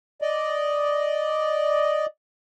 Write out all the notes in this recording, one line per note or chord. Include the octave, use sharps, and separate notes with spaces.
D5 D#5